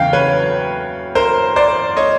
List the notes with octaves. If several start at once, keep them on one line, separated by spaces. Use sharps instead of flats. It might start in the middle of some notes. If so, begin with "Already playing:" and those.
Already playing: E2 C#3 F#3 F5 G5
B4 C#5
A#4 C5
C5 D5
C#5 D#5